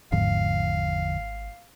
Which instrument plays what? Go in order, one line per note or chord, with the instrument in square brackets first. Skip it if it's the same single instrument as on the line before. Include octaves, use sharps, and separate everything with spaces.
[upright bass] G#1 [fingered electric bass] E2 D3 F3 [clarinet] F5